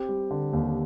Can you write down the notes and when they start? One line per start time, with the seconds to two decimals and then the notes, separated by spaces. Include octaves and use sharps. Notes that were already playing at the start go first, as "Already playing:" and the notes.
Already playing: C4 G4
0.09 G3
0.31 D3
0.53 D#2